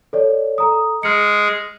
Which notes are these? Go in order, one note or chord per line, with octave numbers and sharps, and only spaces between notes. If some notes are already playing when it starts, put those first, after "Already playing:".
A4 C#5 D5
A4 A#5 D#6
G#3 G#4 F6 C#7